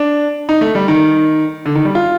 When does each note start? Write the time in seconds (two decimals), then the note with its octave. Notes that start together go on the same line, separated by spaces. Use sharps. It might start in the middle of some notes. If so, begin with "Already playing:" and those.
Already playing: D4
0.49 D#4
0.61 A3
0.75 G3
0.88 D#3
1.66 D3
1.75 D#3
1.85 G3
1.95 F4